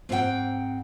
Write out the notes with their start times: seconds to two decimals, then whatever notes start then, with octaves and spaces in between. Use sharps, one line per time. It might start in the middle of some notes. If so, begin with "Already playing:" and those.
0.09 G#2 C4 F4 B4 F#5 G5